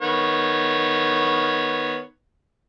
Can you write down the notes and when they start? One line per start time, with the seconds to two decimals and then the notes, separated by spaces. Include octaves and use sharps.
0.02 D#3 B3 C#5